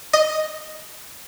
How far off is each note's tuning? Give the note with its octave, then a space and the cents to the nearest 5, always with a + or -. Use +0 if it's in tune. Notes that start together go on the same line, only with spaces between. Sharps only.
D#5 +0 D#6 +0